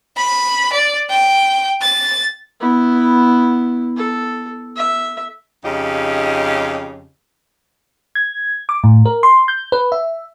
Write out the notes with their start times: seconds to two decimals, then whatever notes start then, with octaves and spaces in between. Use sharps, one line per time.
0.17 B5
0.73 D5
1.10 G5
1.81 A6
2.60 B3 E4
3.97 A4
4.76 E5
5.64 F2 C#3 D#4 G4
8.15 G#6
8.69 D6
8.84 A2
9.06 A#4
9.23 C6
9.48 G6
9.72 B4
9.92 E5